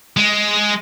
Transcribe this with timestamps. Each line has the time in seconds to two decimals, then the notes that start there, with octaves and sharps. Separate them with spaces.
0.17 G#3